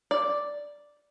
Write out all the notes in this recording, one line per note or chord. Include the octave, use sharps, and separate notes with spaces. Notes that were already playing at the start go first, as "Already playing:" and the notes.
D5